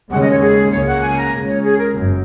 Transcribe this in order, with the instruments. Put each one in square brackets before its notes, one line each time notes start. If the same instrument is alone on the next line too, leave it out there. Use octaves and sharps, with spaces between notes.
[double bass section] D#2 C#3 G#3 C#4 [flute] F#5
[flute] D#5
C#5
G#4
[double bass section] C#2 C#3 A#3 C#4 [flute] C#5
[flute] F#5
G#5
A#5
[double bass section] C#2 C#3 G#3 C#4
[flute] C#5
G#4
A#4
[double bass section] F#1 F#2